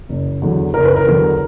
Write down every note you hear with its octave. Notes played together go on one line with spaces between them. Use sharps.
F#1
E2 D3 F#3
F#1 A#4
B4
A#4
E2 D3 F#3